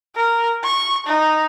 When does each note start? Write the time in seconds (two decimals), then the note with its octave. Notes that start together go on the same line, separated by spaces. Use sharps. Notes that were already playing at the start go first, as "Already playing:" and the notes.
0.16 A#4
0.64 C#6
1.06 D#4